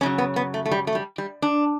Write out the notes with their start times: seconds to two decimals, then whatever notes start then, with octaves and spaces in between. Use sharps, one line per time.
0.01 F#2 C#3 F#3 C#4
0.18 B3
0.36 B3
0.54 A3
0.66 A3
0.71 G3
0.87 A3
0.95 G3
1.18 G3
1.42 D4